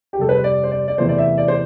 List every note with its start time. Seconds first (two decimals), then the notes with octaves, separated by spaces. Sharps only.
0.13 G4
0.18 F2 C3 G3 A4
0.29 B4
0.37 C5
0.44 D5
0.64 C5
0.71 D5
0.88 D5
0.98 E2 C3 E3 A3 C5
1.09 D5
1.18 E5
1.38 D5
1.48 C5